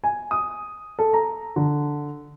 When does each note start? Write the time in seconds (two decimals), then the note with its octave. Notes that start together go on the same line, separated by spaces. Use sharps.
0.04 G#5
0.31 D#6
0.99 A4
1.13 A#5
1.56 D3